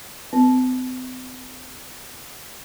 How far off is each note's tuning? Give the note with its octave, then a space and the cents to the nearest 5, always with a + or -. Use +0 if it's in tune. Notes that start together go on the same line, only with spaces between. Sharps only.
C4 -45